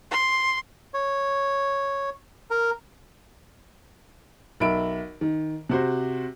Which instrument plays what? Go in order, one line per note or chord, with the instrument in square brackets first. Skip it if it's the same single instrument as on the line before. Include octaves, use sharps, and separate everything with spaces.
[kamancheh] C6
[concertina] C#5
A#4
[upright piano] B1 A#4 E5 B5 D7
D#3
C3 F#4 C5